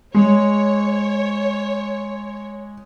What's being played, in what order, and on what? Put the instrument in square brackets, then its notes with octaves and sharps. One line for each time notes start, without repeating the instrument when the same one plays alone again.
[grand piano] G#3 [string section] C#5